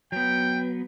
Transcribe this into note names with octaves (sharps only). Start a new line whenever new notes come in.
F#3 B3 G5